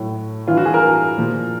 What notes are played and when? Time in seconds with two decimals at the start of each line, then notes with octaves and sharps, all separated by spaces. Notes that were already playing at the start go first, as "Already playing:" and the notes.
Already playing: A2 F#3
0.48 G2 E3 F4
0.57 F#4
0.65 G#4
0.74 A#4
1.17 A#2 F3